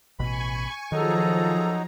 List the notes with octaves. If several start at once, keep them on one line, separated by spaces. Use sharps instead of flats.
A1 B2 G#5 B5 C#6
D#3 F3 F#3 D#4 G#4 A4 A#5